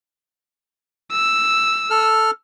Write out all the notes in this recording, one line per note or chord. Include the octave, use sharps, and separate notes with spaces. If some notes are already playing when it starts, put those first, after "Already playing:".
E6
A4 F6